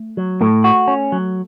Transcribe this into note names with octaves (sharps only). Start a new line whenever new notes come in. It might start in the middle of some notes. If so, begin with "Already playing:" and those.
Already playing: A3
F#3
A2 A3 A4
F#4
C#4
F#3